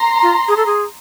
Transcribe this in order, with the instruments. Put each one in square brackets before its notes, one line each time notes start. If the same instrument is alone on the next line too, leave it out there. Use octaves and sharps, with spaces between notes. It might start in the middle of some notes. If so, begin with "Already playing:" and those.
Already playing: [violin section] A#5 C6
[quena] F4
G#4
A4
G#4